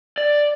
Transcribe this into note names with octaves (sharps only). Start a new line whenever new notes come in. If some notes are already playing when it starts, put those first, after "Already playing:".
D5